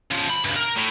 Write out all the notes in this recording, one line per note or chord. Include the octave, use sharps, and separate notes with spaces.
C#3 F3
B5
C#2 G2
A#4
A2